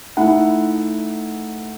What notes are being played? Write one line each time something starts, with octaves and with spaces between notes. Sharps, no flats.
A3 D#4 E4 F#5